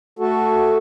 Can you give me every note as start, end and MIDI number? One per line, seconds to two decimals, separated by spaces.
0.19 0.78 57
0.19 0.78 66
0.19 0.78 69